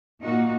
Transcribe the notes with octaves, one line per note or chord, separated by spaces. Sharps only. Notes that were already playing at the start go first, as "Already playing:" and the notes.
A#2 A#3 D#4 F#4